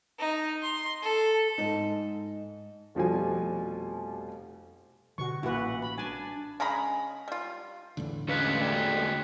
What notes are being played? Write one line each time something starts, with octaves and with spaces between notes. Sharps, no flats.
D#4
C6
A4
G#2 D#4
F1 B2 F3 G3 G#5
B2 D3 F#4 C#6
A1 A#2 E4 F#4 B4 F#5
B5
D4 G#5 A5
C#3 G#3 A#5 B5
G3 F4
E2 A2 D3
D2 G#3 C#4 B4 F5 F#6 B6 C#7
A4 D5 G5